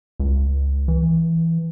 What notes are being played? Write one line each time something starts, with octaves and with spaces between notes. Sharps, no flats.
C#2
E3